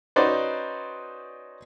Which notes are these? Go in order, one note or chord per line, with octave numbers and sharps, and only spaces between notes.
C#4 D#4 F#4 B4 C5 D5